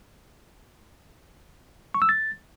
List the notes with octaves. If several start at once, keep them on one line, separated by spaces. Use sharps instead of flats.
C#6
E6
A6